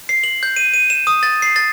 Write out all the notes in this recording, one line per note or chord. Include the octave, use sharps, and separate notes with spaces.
C7
F#7
G6
D#7
D#7
E7
D#6
A6
C7
A6